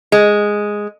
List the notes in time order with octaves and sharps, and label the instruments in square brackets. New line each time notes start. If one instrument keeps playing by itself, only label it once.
[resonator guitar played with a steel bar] G#3